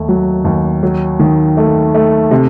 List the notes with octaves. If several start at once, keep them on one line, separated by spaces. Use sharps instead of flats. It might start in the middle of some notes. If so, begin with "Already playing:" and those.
Already playing: D#2 A3
F#3
D#2
F#3
D#3
A3
A3
C3